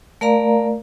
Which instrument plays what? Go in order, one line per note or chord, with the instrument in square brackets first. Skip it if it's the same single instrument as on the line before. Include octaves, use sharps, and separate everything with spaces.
[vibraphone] A3 A#4 D5 F5 A#5